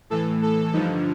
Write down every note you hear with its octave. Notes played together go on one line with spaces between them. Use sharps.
A2 E3 A4
A4
G2 D3 F3 D#4